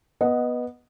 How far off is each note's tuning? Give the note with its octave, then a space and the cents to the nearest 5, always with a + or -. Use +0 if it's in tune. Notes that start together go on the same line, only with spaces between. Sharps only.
B3 -10 D#5 +0 F#5 +0